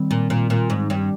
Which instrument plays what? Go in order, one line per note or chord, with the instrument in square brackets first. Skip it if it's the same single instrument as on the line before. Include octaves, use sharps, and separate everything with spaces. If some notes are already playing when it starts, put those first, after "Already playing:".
Already playing: [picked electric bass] D#3 G3 C4
[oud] A#2
A#2
A#2
G#2
G2